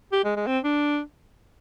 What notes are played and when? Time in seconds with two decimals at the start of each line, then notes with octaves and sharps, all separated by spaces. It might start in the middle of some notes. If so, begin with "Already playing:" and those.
0.12 G4
0.24 G#3
0.36 G#3
0.47 C4
0.64 D4